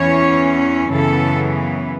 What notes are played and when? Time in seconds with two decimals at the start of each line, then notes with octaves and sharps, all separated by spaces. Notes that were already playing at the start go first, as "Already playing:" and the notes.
Already playing: E2 E3 C#4 C#5
0.91 F#2 C#3 E3 B3 A4